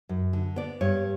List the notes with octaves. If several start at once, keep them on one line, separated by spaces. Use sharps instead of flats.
F#2
D3
B3 D5
G2 C#5